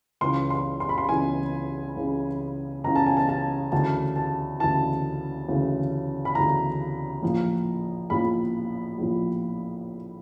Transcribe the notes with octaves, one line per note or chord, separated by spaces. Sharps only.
C#2 C#3 E3 C6
C6
C6
B5
C6
C#2 C#3 E3 G#5
C#2 C#3 E3
C#2 C#3 E3 A#5
A5
G#5
A5
A5
D2 C#3 E3 A5
A5
D2 C#3 E3 A5
D2 C#3 E3
B5
D2 C#3 E3 A#5
A#1 A2 F3
A#1 A2 F3 B5
A#1 A2 F3